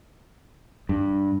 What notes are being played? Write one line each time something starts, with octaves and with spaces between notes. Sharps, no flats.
G2